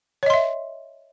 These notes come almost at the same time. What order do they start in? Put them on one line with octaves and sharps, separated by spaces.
C#5 D#5 C6 E5